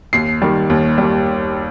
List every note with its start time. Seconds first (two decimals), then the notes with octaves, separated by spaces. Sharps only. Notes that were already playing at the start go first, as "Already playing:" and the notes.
0.13 D#2 C7
0.42 D#3 G3
0.70 D#2
0.98 D#3 G3